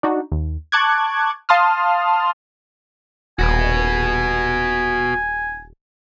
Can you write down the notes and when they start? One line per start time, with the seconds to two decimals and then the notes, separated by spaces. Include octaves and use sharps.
0.03 D4 D#4 F#4
0.32 D#2
0.72 A5 C#6 D6 F#6 G#6
1.49 F5 A5 C6 D#6 F6
3.39 D#1 F#4 B4 G#5